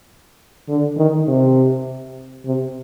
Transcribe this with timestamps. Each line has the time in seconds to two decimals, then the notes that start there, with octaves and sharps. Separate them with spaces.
0.69 D3
0.97 D#3
1.27 C3
2.45 C3